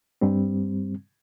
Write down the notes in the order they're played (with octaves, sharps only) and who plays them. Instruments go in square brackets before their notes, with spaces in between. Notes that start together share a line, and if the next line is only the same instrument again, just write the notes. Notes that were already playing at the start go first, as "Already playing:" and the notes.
[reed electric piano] G2 G3 C4